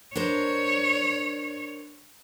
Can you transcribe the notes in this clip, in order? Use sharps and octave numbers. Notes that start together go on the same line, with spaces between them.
D4 A#4 C5 C#5